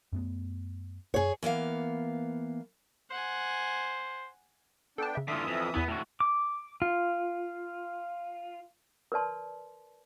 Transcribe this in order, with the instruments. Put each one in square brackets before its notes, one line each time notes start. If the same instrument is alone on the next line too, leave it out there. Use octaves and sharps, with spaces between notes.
[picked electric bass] F#2 A3 B3
[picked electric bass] D1 F#2 [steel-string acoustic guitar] G#4 C#5
[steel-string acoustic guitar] E3 A#3 B3 F5
[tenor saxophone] C5 [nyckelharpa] F#5 G#5
[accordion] B3 D4 G5 [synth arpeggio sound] A4 A5
[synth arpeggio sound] C#3 E5
[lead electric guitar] D3 F4 [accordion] E3 E5 D#6 [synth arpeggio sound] B6
[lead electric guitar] F2
[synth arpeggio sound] E2 E4 B5 [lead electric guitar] B3
[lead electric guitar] A2 F#4
[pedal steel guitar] D6
F4
[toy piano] A#4 B4 D5 A5 C6